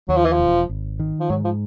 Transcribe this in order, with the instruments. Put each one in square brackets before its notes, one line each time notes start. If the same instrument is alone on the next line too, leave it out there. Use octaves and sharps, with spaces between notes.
[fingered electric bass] D#2 [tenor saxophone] F#3
[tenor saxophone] F3
E3
F3
[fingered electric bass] E1
G#1
D#3
[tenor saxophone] F3
[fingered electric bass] G#2 [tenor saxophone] F#3
[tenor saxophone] F3